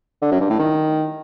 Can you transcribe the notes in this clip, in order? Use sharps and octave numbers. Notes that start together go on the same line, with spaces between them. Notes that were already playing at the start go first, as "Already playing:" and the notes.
D3
F#2
G2
A2
D#3